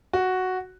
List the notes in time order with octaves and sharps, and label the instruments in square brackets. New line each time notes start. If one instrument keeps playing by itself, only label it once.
[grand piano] F#4